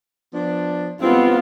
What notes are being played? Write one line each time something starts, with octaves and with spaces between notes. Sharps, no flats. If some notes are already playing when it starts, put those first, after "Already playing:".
F3 B3 D4
G2 G#3 B3 C4 F4